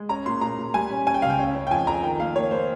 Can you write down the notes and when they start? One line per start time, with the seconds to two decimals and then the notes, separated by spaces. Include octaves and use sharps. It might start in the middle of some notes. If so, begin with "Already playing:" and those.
Already playing: G#3
0.09 C#4 A#5
0.26 A#2 C6
0.41 A#2 A#5
0.58 A#2
0.74 G3 G#5
0.90 C#4
1.07 C#4 G#5
1.14 G5
1.22 C#2 F5
1.30 G5
1.39 C#4
1.55 C#4
1.67 G5
1.71 F2 G#5
1.87 F2 A#5
2.03 D#3 G5
2.20 A#3 F5
2.36 A#3 C#5
2.51 A#3 C5